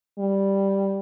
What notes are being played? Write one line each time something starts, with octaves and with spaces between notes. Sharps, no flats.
G3